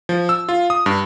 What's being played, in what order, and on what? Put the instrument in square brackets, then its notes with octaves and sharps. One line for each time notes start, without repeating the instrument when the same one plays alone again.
[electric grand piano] F3
E6
F4
D#6
G2